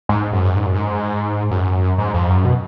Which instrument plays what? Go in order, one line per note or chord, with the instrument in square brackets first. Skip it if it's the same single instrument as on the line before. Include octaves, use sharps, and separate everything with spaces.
[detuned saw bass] G#2
F#2
G#2
F#2
G#2
F#2
G#2
F2
F#2
B2